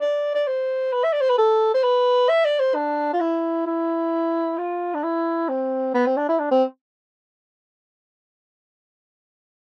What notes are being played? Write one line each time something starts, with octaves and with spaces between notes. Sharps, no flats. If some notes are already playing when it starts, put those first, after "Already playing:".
D5
D5
C5
B4
E5
D5
C5
B4
A4
C5
B4
E5
D5
C5
D4
F4
E4
E4
F4
D4
E4
C4
B3
C4
D4
E4
D4
C4